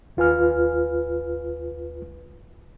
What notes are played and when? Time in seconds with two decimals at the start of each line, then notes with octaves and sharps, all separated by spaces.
0.17 D#2 F4 B4 G#5 F6